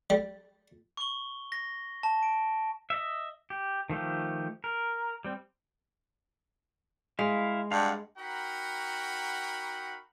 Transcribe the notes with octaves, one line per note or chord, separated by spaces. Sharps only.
G3
C#6 G7
A#6
A5
D7
D#5 E5
G4
D#3 F3 A3 G4
A#4
G3 C4
G#3 E4 F5
G2 F5 F#5
D#4 F#4 A#4 F#5 G5 B5